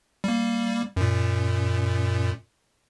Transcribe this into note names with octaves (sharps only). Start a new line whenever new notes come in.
G3 A#3
F#2 A#2